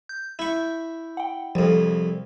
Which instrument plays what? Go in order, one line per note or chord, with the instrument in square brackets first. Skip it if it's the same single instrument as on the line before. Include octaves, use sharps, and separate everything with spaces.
[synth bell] G6
[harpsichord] E4 C#6
[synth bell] F#5 G5
[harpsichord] C2 F2 [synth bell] F3